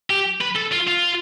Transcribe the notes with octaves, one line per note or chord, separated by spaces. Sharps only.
G4
B4
A4
F4
F4